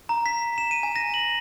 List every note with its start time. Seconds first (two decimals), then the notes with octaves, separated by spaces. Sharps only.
0.09 A#5
0.26 B6
0.58 E7
0.71 D#7
0.83 G#5
0.96 A#6
1.14 F#7